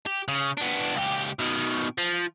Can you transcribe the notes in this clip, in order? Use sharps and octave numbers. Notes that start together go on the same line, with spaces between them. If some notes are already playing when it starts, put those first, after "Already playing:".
G4
C#3
B3 D4
C#2 G4
B2 D#3
F3